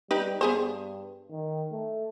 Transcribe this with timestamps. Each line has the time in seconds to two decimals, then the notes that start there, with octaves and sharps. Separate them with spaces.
0.11 G3 D#4 G4 B4
0.41 G2 B3 G#4 C5
1.31 D#3
1.72 A3